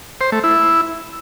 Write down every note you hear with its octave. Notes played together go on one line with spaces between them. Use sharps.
C5
A3
E4